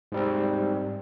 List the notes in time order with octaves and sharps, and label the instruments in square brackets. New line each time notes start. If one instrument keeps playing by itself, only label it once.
[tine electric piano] G#2 G3 C4